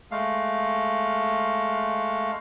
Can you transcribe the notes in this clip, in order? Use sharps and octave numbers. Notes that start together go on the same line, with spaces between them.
G#3 A3 F5